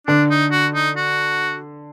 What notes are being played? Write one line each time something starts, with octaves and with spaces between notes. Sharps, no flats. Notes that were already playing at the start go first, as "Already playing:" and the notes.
D3 D4
D#4
F#4
D#4
F#4